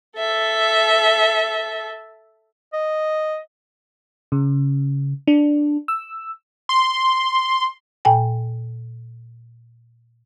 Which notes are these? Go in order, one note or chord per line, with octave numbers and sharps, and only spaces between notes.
A4 E5
D#5
C#3
D4
E6
C6
A#2 G5 G#5